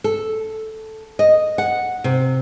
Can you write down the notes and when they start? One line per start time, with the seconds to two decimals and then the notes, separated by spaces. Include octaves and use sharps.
0.04 A4
1.19 D#5
1.58 F#5
2.04 C3